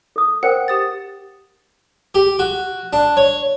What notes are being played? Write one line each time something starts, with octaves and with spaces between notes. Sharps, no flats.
A4 D#6
A#4 C5 F#5 G5
G4 D#6 A6
G4
F#4
D4
C#5